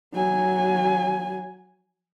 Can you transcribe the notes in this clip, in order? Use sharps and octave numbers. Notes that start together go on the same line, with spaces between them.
F#3 G#5